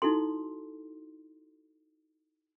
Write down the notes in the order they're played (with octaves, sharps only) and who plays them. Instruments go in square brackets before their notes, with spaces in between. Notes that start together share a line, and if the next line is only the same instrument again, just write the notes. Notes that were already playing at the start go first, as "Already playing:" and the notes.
[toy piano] D#4 E4 F#4 A4 C6